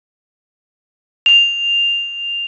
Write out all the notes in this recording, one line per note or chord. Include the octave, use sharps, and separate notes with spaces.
F7